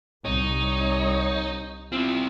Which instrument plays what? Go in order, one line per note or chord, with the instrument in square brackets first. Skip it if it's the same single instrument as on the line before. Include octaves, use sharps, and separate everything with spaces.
[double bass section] C2 [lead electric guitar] D#4 [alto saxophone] C#5
[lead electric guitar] C4 E4 [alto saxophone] F4